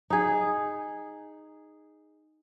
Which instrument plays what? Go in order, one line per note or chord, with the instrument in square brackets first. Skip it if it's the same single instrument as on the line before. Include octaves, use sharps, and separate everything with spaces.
[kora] D#4 G#4